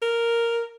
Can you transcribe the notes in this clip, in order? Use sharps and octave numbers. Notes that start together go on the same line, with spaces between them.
A#4